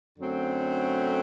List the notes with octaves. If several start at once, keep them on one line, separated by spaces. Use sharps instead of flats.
F#2 D3 F#3 A3 C4